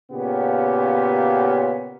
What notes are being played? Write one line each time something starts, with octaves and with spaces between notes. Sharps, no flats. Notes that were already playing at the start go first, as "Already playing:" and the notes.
A#2 C#3 B3 C#4 G4